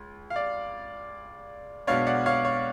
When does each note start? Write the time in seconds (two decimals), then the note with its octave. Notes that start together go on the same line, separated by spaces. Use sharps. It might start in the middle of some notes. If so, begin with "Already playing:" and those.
Already playing: C#2
0.30 F5
0.36 D5
1.87 B1 B2 G#3 B3 D4 C#5 F5
2.07 D5 F#5
2.26 C#5 F5
2.45 C#5